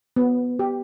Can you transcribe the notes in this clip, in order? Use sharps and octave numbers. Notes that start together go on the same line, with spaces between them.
B3
G4